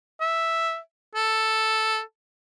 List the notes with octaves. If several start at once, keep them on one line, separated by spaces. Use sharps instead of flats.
E5
A4